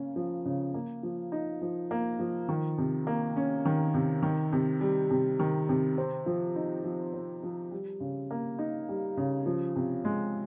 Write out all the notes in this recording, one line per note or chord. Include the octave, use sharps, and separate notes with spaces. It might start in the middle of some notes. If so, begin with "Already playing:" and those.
Already playing: C#3 A#3 C#4
F3
C#3
A#3
F3
D#4
F3
A#3
F3
D#3
C3
A#3
C#4
D#3
C3
D#3
C3
G3
C3
D#3
C3
C4
F3
D#4
F3
C4
F3
G3
C#3
A#3
D#4
G3
C#3
F3
C3
G#3